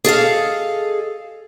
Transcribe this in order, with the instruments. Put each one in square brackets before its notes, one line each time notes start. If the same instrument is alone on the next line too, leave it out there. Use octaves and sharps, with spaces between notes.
[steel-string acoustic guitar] G#4 A4 D#5 F5